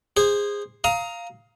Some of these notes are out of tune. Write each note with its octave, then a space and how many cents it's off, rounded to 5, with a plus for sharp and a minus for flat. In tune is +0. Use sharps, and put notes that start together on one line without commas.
G#4 -20 C5 +0
F5 +0 A#5 +0 D#6 +25